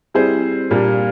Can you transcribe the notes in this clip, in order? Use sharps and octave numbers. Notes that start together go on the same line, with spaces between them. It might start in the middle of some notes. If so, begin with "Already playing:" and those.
G3 C4 E4 G#4 C5
A#2 G3 A#3 D4